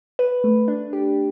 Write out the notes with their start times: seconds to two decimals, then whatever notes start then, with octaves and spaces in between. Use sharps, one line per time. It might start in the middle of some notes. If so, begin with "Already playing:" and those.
0.19 B4
0.44 A3
0.68 D4
0.93 G4